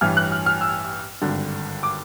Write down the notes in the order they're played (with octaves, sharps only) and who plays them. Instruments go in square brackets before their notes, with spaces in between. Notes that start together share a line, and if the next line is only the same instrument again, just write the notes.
[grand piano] A1 G2 E3 F6
F#6
F6
F6
E6
G#1 G2 D3
D6